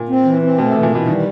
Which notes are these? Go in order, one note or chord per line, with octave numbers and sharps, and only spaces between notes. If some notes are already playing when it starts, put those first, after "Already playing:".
Already playing: A#2
C4
E3
C4
B2 A3
C3
E3
A#2
B2 E3
D#3 G3